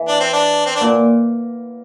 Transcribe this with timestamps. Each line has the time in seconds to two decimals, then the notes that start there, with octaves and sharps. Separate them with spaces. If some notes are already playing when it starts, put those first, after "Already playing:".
Already playing: E3
0.08 D4
0.20 C4
0.33 D4
0.66 C4
0.75 D4
0.81 A#2